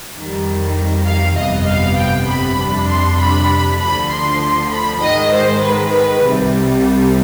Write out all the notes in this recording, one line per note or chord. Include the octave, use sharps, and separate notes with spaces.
F2 D#3 G3
F5
G1 F2 C3 G3 B3 D#5
F5
G5
B5
F2 C3 G3 D4
C6
B5
D2 D3 F3 B5
C6
B5
G#2 D#3 G#3 D#5
C5
B4
B4
C2 C3 G3